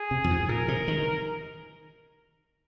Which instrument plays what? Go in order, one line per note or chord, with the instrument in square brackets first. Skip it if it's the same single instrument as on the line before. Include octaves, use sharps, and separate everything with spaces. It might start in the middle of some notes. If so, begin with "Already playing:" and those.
Already playing: [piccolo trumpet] G#4
[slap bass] C3
F2
G#2
[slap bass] A#2 [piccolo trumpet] A#4
[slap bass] C3
D#3